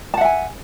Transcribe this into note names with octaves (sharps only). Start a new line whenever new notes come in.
E5 F#5 G#5 A5